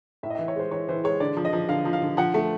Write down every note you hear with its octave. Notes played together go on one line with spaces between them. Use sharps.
A2 E5
D#5
E3 E5
C#5
G#3 C5
E3 C#5
E3 C5
G#3 C#5
D3 D5
F3
D#5
F3
D3 F5
F3
F5
D3
F3 F#5
A3